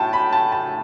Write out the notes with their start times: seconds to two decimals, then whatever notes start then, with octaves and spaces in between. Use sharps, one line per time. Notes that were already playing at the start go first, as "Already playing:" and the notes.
Already playing: A2 G5 A5
0.13 B5
0.33 A5
0.52 A5